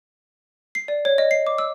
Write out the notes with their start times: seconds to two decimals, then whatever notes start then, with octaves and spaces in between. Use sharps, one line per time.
0.75 C7
0.88 D5
1.05 C#5
1.18 D#5
1.31 C7
1.47 D6
1.58 E6